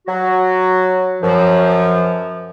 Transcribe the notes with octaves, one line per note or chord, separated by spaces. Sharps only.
F#3 F#4
F#2 F3